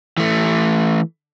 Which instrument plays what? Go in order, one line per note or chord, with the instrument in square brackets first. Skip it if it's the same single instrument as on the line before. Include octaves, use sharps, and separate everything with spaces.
[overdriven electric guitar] E3 A3